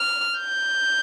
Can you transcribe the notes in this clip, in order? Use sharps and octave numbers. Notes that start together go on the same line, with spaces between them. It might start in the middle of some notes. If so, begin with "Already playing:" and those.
Already playing: F6
G6